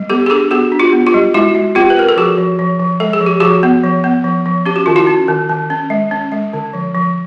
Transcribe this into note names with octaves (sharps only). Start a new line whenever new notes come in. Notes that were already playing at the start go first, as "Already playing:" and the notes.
Already playing: G3
B3 G4 A4
G#4
D4 G4 A4
B3 F#4 G#4
D4
F4 G4
B3
F4 G4
G3
G#3 E4 F#4
G#3
C4 F4 G4
B4
C4 A#4
A4
F3 F#4 G#4
F3
F3
F3
G#3 A4
G#4
F3
G4
F3 F#4 G#4
B3
F3
B3
F3
F3
C#4 G4
F#4
D#3 F4
E4 F#4
C#4
D#3
D#3
C#4
G#3
C#4
G#3
D3
F3
F3